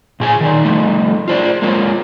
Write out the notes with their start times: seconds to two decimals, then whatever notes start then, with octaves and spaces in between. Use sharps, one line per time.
0.20 A#2 G#4 G#5
0.40 D#3 D#4 D5
0.65 F3 G3 A3
1.28 F4 C5 D5
1.62 G#3 A#3 C#4 F4